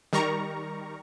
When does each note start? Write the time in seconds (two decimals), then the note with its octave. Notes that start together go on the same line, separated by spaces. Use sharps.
0.13 D#3 G3 A#4 A#5 C#6